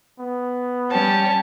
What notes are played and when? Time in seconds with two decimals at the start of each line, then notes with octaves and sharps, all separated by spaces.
0.20 B3
0.91 G3 C#4 G4 A5